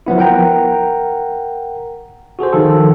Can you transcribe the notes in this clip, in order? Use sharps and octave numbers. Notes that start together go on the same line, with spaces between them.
F3 F#3 B3 E4
A#4 F#5 G5 A#5
F#4 G#4 A4 C5
D#3 F3 F4 A4